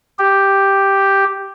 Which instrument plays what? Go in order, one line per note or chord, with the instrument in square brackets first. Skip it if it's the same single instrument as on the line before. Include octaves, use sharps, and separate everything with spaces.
[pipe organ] G4